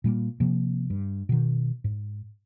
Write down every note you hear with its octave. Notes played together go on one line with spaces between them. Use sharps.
A#2 G3 A#3
C3 F3 A#3
G2
B2 D#3
G#2